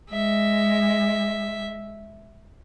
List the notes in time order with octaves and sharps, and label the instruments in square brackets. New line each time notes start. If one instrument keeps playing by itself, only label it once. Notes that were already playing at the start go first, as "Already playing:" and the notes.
[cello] G#3 [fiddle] E5